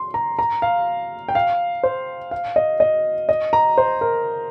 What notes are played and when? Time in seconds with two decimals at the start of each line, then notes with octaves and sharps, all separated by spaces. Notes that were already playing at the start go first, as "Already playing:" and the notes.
Already playing: C6
0.14 A#5
0.39 A#5
0.62 F5
1.28 G5
1.35 F5
1.83 C5
2.31 F5
2.56 D#5
2.80 D#5
3.29 D#5
3.53 A#5
3.78 C5
4.01 A#4